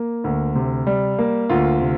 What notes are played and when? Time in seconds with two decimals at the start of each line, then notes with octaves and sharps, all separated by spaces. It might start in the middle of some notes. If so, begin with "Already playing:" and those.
Already playing: A#3
0.24 D2
0.55 C3
0.87 G3
1.18 A#3
1.49 D2 F4
1.81 C3